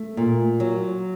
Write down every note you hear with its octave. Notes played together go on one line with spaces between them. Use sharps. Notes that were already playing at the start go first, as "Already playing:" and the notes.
Already playing: A3
A#2
F#3